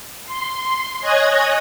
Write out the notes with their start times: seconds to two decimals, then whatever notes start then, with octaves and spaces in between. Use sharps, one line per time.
0.25 C6
1.00 C#5 D#5 G#5 F#6 G#6 A#6